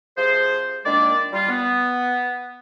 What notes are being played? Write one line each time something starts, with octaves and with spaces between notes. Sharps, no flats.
C3 F3 G#4 C5
A#2 D#3 G#3 A#3 D4 D5
G3 F4
B3